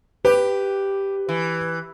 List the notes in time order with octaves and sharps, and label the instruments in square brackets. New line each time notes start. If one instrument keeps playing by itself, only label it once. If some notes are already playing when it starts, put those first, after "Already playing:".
[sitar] G4 [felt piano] B4
[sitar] E3